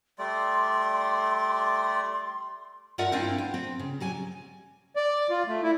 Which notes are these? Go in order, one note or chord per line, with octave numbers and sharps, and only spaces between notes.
G3 A3 D5 C6
G2 F4 A#4 D5 E5 F#5
C4 D4 E4 F4 F5 G5
B3
C4
C#3
F#3 G3 G#5
D5
F4
A3
E4